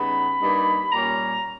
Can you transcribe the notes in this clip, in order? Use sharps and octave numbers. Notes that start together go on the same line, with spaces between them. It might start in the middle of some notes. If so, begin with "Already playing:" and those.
Already playing: C#3 G3 B3 D#4 B5
G2 G3 A#3 D#4
A#2 G3 C#4 A#5